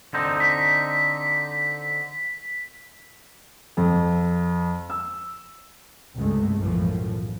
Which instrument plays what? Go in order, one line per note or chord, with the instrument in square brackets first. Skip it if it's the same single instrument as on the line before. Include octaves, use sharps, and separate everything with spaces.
[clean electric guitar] D3 C4 D#4
[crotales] B6
[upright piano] F2
E6
[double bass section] C#2 G2 C3 G#3 A3
B1 F#2 A2 E3 F3